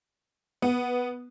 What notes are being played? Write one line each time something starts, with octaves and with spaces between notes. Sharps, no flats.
B3